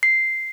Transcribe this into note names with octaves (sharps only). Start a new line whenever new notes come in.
C7